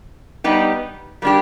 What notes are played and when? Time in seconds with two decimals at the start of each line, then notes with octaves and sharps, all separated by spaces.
0.44 G3 B3 D#4 G4
1.22 G3 A#3 D4 G4